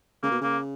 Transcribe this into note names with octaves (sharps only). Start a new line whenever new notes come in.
C#3 A#3
B2
C#3 A#3